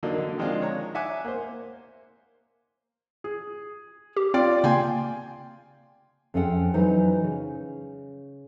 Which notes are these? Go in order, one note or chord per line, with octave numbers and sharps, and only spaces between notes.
D3 F#3 A#3 D4 D#4
D3
D#3 F3 G#3 C4 D4 F4
C#5 A#5
E5 F#5 G#5 D6
A#3 C5
G#4
G4
C4 F4 D5
C#3 A#3 G5 G#5 C6
F2 C4 C#4 G#4 F#5 G5
E3 F#3 D#4 C5
C#3